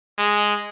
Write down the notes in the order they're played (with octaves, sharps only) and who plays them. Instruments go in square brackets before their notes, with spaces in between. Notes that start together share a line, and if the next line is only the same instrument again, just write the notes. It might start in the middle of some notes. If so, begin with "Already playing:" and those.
[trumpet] G#3